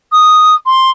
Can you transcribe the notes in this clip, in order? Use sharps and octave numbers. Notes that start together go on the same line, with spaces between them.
D#6
C6